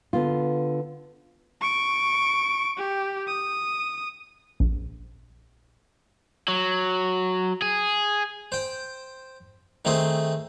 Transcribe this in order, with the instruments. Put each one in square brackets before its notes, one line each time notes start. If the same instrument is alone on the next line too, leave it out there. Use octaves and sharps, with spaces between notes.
[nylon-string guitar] D3 B3 F4
[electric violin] C#6 D7
G4
D#6
[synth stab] A#1
[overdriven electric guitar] F#3
G#4
[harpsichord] C5 G5
D#3 A3 C4 G#4 C6